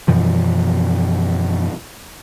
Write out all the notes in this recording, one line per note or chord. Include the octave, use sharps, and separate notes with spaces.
F#2 B2 E3 F3